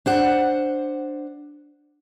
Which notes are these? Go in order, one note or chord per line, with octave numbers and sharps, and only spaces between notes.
D4 C5 F#5